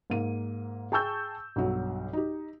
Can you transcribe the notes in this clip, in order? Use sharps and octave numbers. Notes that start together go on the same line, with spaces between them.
G#2 A#3 D#7
G#4 G5 A5 C#6 E6 G6
B1 G2 F#3
D#4 G4